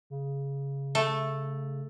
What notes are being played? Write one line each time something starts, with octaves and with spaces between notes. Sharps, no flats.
C#3
A3